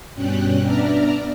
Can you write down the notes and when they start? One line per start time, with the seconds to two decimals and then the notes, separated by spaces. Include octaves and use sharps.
0.15 G2 B2 G3 C#4 G5 F#6
0.61 B3 D4 D5 E5 A#5 F6